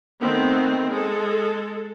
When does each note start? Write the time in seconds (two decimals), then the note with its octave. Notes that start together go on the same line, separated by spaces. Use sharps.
0.19 D#3 A3 B3 C4
0.88 G#3 A4